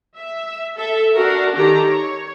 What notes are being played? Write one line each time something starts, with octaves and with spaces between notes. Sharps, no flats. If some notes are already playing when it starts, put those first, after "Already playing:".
E5
A4 E5
D4 F#4 A#4
D#3 G4 A4 A#5
C#5